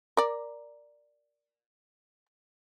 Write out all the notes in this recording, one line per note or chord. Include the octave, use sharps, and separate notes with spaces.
A#4 D5